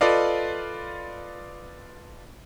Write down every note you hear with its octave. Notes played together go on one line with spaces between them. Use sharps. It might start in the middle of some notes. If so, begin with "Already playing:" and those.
F4 A4 B4 D5 D#5 F5